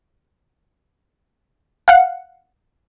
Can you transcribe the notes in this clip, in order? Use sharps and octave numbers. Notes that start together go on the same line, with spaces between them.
F5 F#5